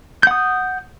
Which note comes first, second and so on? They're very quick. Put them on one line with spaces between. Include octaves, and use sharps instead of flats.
G6 F#5 D#6